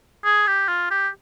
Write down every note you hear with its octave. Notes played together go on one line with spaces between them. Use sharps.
G#4
G4
F4
G4